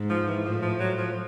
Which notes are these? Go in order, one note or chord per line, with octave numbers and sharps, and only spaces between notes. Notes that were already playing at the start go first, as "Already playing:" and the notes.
Already playing: G#2
F3
E3
A2 F3
F3
F#3
F3